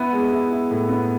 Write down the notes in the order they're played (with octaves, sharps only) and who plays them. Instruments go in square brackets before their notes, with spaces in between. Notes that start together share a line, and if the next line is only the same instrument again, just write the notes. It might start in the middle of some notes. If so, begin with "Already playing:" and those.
Already playing: [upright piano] B3 E4
G#3
E4
E4
A2
B3